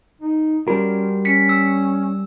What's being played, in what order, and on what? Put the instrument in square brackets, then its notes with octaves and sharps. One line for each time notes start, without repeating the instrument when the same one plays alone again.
[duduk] D#4
[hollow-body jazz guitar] G3 A#4 [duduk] C#4 [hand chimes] F#4
[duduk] C#4 [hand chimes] B6 C#7
[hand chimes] E6